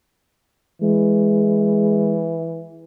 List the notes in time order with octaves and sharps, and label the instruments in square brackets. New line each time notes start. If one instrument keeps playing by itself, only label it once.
[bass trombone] E3 [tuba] G#3